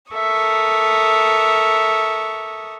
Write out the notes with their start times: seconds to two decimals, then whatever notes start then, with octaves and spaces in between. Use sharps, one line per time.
0.12 A4 A#4 E5 C#6 D#6